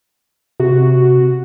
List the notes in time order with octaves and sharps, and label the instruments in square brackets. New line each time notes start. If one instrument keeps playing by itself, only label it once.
[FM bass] C3 [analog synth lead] F#4